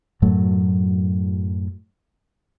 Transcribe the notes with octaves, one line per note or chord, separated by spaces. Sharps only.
F#2 A2 F#3 A3